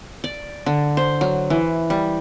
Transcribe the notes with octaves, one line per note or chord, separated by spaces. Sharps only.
D5
D3
C5
F#3
E3
G3